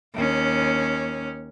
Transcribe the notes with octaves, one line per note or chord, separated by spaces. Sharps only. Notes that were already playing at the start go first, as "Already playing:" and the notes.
D#2 C#4